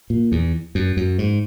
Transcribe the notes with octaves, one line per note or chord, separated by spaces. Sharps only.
A#2
E2
F#2
F#2
G#2